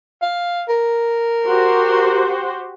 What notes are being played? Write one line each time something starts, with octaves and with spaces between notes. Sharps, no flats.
F5
A#4
F#4 G4 C5